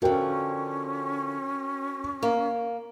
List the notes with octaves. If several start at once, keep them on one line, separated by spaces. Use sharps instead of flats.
D3 F3 C#4 F#4 A#4 G5
A#3